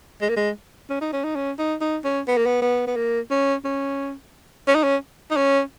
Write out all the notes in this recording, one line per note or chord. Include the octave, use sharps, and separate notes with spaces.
G#3
A#3
G#3
C#4
D#4
C#4
D#4
C#4
D#4
D#4
C#4
B3
A#3
B3
B3
B3
A#3
C#4
C#4
C#4
D#4
C#4
D#4
C#4